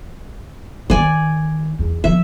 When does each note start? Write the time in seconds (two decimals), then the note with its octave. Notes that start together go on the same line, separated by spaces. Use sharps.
0.90 D#3 D#4 D5 G#5
1.79 E2
2.04 D3 F3 E5